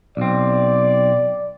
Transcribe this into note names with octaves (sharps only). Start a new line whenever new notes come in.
B1 C4 D5